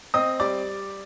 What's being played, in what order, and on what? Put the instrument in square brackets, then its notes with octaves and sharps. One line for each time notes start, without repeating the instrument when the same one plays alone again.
[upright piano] C4 D#5 D#6
G3 D5 D6